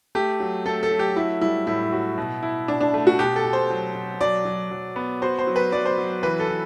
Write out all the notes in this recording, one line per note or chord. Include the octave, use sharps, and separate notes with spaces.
A3 G4
F#3
A3 A4
A4
F#3
G4
E4 F#4
G3 E4
A2 E4
F#4
B2
E4
B2 D4
D4
A3
F#4
B2 G4
A4
B2
C5
F#3
B2
F#3 D5
F#3
F#3
B3
F#4 C5
C5
F#3
B4
F#3 D5
C5
F#3
E3 B4
A4
E3